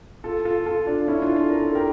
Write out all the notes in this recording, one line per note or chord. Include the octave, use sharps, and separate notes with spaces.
F4 A4
F4 A4
F4 A4
D4 F4
C#4 E4
D4 F4
F4 A4
A#4
A4
G4 A#4